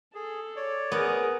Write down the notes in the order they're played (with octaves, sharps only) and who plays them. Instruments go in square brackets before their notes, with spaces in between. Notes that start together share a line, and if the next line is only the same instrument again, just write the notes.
[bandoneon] G#4 [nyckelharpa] A4
[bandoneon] C#5 D5
[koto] B3 [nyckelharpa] G#4 A#4